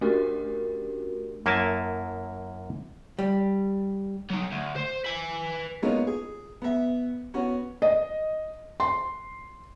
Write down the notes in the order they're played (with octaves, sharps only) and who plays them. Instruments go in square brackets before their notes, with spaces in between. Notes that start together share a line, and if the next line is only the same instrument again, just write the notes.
[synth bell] A3 C#4 D4 F#4 G4 A#4
[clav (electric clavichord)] F#2 A#3 E4 G#5 A5
[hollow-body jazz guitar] G3
[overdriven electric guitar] F#3 D#4
D2
C5
B4 G#5
[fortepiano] G#3 A#3 B3 C#4 D#4 F4
G#4
B3 E5
B3 C#4 F#4
[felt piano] D#5
C6